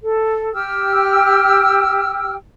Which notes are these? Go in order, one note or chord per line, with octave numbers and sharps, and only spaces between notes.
A4
G4 G5 E6 F6